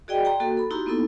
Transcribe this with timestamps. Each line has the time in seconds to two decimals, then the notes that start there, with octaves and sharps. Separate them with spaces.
0.08 F#4 G#4 D5 D#5 G5
0.25 G5 A#5 C6
0.40 A#3 F#4 A4
0.57 A4 B5
0.71 D#4 E4 F#4 G4 A#5 C6
0.86 A#3 B3 D#4 E4 A4